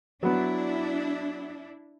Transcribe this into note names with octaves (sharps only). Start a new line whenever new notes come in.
F#3 B3 D4 E4